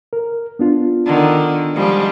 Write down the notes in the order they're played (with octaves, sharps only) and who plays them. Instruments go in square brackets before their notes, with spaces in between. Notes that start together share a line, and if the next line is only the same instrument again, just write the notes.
[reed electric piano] A#4
B3 D4 F4
[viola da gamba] D3 D#3
F3 G3 G#3